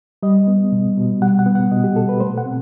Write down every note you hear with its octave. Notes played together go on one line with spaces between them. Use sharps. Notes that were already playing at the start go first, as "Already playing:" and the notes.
G3 D#5
B3
B2
B2
G3 F#5
F#5
B3
F#5
B2 D#5
G4
B2 A4
B4
A3 C5
F#5
C4